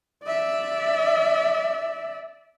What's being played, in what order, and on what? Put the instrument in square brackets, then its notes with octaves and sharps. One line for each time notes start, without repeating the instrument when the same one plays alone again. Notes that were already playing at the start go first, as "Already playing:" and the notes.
[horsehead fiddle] D5 E5